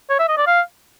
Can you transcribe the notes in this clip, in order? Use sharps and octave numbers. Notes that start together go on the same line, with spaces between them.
C#5
E5
D#5
D5
F5